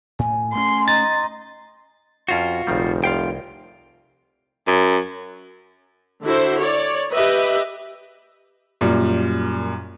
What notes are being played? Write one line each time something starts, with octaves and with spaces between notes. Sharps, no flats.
A2 G#5
G2 A3 C#4 C6
D#4 C6 A6
F2 C#4 F4 F#4 C5
F1 A#1 D#3 G3
C2 F4 F5 G5
F#2
D3 E4 F#4 C5
C#5 D5
G4 B4 D#5 E5
F#2 A#2 G3